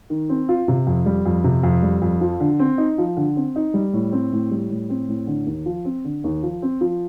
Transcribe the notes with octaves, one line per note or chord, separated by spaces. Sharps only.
D#3
C4
F4
C3
F2
G3
F2
C3
F2
G3
F2
F3
D3
C4
D#4
F3
D3
C4
D#4
G3
A2
C4
A2
G3
A2
C4
A2
D3
D#2
F3
C4
D3
D#2
F3
C4
F3